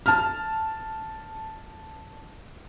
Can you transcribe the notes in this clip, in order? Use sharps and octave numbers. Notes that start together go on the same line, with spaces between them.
A5 F6